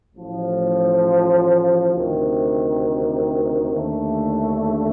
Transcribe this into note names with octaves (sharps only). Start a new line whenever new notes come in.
A1 A2 F3
D2 C3 D#3
D#2 D3 A3 D4